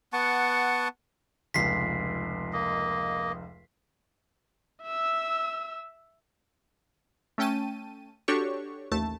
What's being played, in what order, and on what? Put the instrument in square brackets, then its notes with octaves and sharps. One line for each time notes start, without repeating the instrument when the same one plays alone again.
[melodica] B3 F#5 A5 C#6
[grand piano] F1 C#2 [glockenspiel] B6 C7
[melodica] A#3 D#5
[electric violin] E5 E6
[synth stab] A3 C#4 G5 A5 D#7
D4 F#4 G4 A4 C#5 C#6
A1 D#2 A3 A5